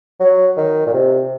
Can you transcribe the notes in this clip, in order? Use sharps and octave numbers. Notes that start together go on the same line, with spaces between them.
F#3
D#3
A#2
C3